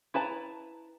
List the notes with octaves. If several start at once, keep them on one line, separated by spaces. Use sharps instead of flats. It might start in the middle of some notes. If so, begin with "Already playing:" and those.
E4 B4 A5 A#5